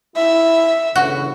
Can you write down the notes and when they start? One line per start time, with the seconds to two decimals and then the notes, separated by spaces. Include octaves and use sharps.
0.17 E4 E5
0.96 G1 C#3 E3 F#4